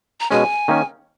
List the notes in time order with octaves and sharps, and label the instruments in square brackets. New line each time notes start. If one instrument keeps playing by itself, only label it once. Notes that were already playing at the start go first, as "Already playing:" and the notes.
[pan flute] A#5
[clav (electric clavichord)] B2 G#3 C#4 [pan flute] G#5
[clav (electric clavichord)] D#3 A#3 C#4